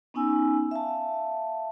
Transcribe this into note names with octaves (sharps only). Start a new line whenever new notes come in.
B3 C#4 D#4 G#5 E6
E5 F5 A5